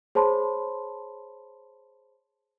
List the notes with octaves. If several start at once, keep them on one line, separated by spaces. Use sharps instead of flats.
G#4 C5 C#5 A5 B5 C6